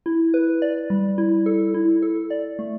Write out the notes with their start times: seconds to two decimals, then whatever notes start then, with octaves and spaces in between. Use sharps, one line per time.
0.06 E4
0.34 B4
0.62 D5
0.90 G3
1.18 E4
1.46 A4
1.74 E4
2.02 A4
2.30 D5
2.59 A3